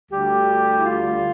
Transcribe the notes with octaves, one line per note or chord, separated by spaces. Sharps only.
D2 D3 G3 G4
E4
F4